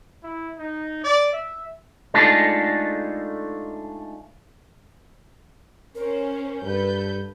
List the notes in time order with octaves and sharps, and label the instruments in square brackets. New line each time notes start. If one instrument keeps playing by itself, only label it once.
[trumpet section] E4
D#4
D5
E5
[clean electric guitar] G#3 A3 D4 D#4 F4 A4
[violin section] C#4 C5 [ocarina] A#4
[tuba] G2 [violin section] A4 B4 G6